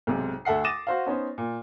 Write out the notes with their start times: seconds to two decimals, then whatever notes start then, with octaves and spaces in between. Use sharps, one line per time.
0.07 B1 G#2 C3
0.45 D2 A4 E5 F#5 C7
0.64 D6 D#6 A6 A#6 D#7 E7
0.87 F#4 C5 F5
1.06 B3 C#4 D#4 C5
1.38 A#2